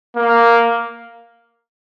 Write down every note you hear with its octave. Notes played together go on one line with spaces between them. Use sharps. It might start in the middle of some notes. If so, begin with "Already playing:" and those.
A#3